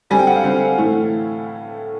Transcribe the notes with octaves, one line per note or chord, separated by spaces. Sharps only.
D3 G3 C4 G#5
G5
F#5
F5
D3 G3 C4
A2 E3 A3